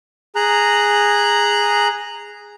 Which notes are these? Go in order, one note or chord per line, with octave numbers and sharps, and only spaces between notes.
G#4 A#5 F#6